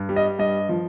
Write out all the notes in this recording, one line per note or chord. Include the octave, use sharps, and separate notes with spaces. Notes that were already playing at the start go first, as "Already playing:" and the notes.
Already playing: G2
G3
D#5
G2 D#5
F3